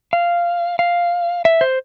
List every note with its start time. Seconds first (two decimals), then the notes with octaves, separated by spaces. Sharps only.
0.13 F5
0.79 F5
1.45 E5
1.61 C5